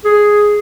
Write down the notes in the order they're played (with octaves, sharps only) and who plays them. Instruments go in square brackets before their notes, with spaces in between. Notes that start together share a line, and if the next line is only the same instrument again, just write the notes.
[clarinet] G#4